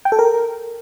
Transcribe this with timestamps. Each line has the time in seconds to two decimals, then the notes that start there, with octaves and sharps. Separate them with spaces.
0.05 G5
0.12 A4
0.19 A#4